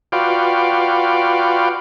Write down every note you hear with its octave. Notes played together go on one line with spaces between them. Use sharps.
F4 F#4 B4 D5 F5 G5